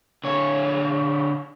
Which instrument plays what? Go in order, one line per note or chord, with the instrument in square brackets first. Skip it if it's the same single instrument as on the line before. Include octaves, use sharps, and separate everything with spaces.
[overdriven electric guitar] D3 C#5